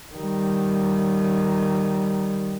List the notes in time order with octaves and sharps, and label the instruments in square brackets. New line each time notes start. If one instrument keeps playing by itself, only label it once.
[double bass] D#3 G3